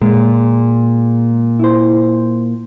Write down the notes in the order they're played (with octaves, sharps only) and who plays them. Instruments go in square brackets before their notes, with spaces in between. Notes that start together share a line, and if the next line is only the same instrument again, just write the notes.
[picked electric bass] A#2 [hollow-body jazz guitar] G#3
[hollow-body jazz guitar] E4 C5